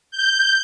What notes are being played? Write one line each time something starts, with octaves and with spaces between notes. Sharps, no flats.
G6